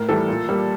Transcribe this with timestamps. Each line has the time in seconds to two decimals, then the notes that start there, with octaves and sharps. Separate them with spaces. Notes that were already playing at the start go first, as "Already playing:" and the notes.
Already playing: A2 A#4
0.09 E3 G3 A4
0.28 A#2
0.49 G3 A#3